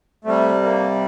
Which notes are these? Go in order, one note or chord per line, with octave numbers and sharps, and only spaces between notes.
C3 G3 A3
A#3